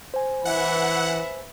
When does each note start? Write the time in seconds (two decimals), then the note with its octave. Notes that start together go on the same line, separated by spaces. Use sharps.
0.14 C5 G#5
0.45 E3 B4 E5 F#5